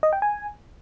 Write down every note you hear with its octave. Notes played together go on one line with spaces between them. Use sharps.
D#5
G5
G#5